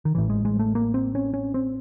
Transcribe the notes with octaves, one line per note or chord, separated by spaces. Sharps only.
D#3
A1 A2 E3
G#3
G#3
A3
A#3
C4
C#4
C#4
C4